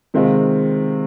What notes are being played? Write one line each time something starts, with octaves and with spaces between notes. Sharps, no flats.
C3 D#3 G#3 C4 F4